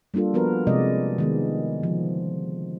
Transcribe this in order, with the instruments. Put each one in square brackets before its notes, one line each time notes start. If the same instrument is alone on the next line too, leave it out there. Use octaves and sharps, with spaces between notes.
[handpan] G3 A#3 D4 F4 A4
F3 B3 F#4 A#4 B4
C3 F3 G#3 D5 D#5
D#3 G#3 B3
D3 F3